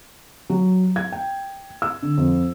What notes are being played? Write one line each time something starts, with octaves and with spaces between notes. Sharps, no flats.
F#3
G#6
G5
E6
D3
F2